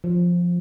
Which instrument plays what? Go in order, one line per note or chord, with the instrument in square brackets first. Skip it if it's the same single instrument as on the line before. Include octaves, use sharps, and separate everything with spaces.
[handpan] F3